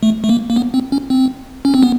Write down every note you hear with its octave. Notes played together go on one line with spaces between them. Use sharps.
A3
A3
A#3
A#3
B3
C4
C#4
C4
C#4
C4
B3